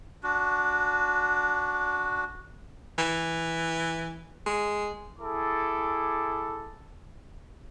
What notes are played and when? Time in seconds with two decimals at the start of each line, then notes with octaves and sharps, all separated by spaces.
0.23 D4 F#4
2.98 E3
4.46 G#3
5.19 E4 G#4 A4 D6